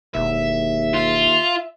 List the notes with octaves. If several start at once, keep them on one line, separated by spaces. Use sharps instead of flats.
E1 D#2 E5
F4